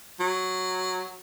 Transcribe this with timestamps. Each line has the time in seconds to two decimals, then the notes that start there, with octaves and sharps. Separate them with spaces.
0.20 F#3